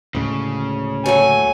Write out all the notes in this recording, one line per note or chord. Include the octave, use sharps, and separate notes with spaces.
D2 A2 C#3 G#3
F#3 A3 G#5